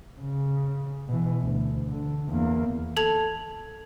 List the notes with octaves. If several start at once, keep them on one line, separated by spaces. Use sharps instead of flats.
C#3
B2 E3
D2
D3
E2 A#3
A4 A5 G#6 F7